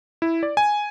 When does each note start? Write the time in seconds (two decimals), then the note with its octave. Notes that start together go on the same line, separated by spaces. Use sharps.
0.22 E4
0.43 D5
0.57 G#5